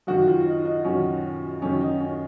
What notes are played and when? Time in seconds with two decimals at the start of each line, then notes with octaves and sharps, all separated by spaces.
0.07 F#2 D#3 F#4
0.27 F4
0.47 D#4
0.65 D#4
0.85 F#2 D#3 C#4
1.62 F#2 D#3 C#4
1.81 D#4
2.00 C#4